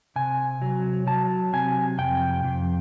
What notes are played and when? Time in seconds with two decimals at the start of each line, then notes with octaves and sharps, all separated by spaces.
0.16 C3 G#5
0.62 F#3
1.07 F#3 A5
1.53 C3 G#5
1.98 F2 G5
2.44 F2